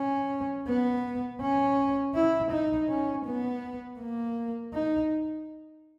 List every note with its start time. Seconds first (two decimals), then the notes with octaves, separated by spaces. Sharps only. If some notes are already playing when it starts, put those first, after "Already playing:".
Already playing: C#4
0.67 B3
1.41 C#4
2.15 E4
2.51 D#4
2.89 C#4
3.26 B3
3.99 A#3
4.74 D#4